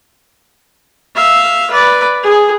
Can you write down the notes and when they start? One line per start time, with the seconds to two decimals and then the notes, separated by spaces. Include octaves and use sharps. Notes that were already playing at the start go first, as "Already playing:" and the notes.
1.15 E5 F5
1.70 B4 D5
2.23 G#4